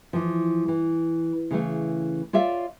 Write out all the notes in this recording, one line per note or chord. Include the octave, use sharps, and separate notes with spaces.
E3 F3
E3
C#3 E3 A3
F4 C#5 D5 E5 F5